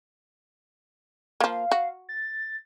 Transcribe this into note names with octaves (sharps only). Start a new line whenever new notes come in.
F3 A#3 F5
F#4
A6